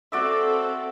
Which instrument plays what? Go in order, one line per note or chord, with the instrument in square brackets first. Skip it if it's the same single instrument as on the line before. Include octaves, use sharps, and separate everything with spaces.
[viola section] C4 A4 [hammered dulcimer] F#4 D5 E5